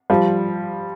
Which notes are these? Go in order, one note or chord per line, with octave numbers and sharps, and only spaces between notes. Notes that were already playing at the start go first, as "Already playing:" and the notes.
F3 G3